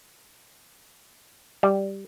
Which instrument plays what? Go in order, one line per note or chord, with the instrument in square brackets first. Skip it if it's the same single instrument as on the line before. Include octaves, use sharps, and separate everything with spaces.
[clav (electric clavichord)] G3